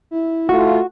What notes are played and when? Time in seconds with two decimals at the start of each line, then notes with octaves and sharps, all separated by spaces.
0.11 E4
0.49 A3 F4 F#4